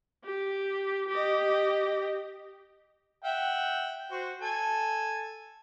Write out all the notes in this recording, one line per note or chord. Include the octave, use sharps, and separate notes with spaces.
G4
G4 D#5
E5 F#5 G5
F#4 C5
A4 G#5